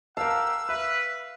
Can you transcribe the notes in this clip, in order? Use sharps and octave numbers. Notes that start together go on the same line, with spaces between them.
G4 A#4 F5 F#5 A5 E6
B4 E5